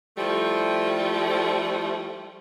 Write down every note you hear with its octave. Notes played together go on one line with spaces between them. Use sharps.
F3 G3 A3 E4